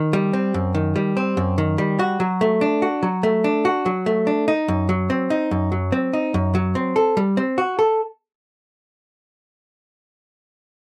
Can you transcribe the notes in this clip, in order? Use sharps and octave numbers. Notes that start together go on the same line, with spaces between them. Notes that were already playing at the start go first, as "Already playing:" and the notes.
Already playing: D#3
G3
C4
F#2
D#3
G3
C4
F#2
D#3
G3
F#4
F#3
A3
D4
F#4
F#3
A3
D4
F#4
F#3
A3
D4
D#4
F#2
F#3
C4
D#4
F#2
F#3
C4
D#4
F#2
F#3
C4
A4
G3
C4
F#4
A4